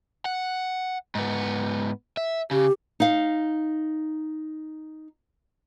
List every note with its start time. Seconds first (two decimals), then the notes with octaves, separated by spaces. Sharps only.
0.25 F#5
1.15 G#2 B3
2.17 E5
2.51 C#3 G4
3.00 D#4 F5